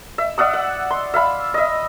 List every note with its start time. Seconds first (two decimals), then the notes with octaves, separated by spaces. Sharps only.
0.18 E5
0.38 D5 E5 F#5 D#6
0.54 F#5
0.90 C6
1.14 E5 F5 B5
1.54 D#5 E5